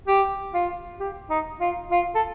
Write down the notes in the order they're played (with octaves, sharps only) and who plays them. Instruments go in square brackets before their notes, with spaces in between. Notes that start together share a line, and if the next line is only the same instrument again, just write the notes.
[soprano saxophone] G4
F4
G4
D#4
F4
F4
A4